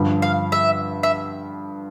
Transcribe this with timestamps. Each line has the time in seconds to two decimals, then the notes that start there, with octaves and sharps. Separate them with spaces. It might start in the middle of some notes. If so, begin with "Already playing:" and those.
Already playing: G2 D3 F3
0.22 F5
0.52 E5
1.03 E5